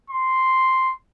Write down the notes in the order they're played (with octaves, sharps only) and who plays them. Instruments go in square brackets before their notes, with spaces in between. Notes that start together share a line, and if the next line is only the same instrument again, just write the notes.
[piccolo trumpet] C6